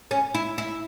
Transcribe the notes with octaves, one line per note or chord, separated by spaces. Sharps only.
C#4
E4
E4